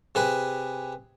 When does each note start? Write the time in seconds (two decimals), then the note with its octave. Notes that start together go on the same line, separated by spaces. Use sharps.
0.15 C3 G#4 B4